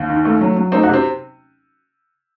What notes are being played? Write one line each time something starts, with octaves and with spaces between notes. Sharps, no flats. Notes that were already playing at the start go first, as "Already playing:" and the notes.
Already playing: D#2
D#3
A3
F#3
F#3
A3 C4 D#4
D#4 F#4
C3 C4